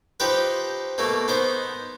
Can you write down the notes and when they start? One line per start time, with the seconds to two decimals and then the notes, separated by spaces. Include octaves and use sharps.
0.20 F3 D#4 G4 B4
0.98 B2 A3 A#3
1.28 B3 D#4 C5